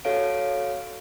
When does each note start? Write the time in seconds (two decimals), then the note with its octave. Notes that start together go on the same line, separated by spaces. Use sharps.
0.05 F#4 A4 C#5 F5 D7